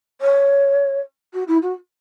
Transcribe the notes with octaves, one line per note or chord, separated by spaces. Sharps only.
C#5
F#4
E4
F#4